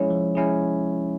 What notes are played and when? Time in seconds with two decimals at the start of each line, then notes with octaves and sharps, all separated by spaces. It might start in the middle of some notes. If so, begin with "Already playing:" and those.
Already playing: F3 G#3 C#4 E4 G#4 C#5
0.10 F3
0.35 G#3 C#4 E4 G#4